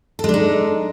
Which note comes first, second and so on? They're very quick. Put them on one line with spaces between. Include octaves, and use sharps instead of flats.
A4 G#3 D4 D#4